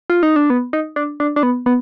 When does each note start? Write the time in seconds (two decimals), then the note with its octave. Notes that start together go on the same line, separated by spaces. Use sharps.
0.10 F4
0.23 D#4
0.36 D4
0.50 B3
0.73 D#4
0.96 D4
1.20 D4
1.36 D4
1.43 B3
1.66 B3